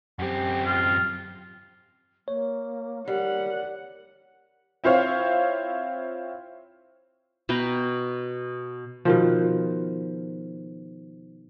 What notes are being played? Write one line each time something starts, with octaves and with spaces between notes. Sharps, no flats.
F#2 C4 G4
F4
A#3 C#5
G3 A#4 F#5
C4 E4 F4 C5 C#5 F5
B2 B4 G5 A#5
B2 D#3 F3